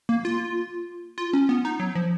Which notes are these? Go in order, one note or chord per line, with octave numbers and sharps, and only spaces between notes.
A#3
F4
F4
C#4
B3
D#4
F#3
F3